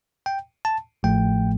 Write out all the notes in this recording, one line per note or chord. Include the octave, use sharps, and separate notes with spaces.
G5
A5
A1 A2 F3 A3 G5